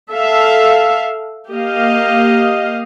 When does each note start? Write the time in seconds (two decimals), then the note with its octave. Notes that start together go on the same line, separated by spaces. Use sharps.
0.13 A4 E5 F5
1.51 A#3 G4 D#5 F5